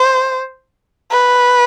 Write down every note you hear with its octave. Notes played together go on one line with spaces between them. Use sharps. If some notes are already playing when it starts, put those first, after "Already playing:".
Already playing: C5
B4